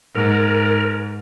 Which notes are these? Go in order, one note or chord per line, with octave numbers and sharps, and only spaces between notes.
G#2 A#4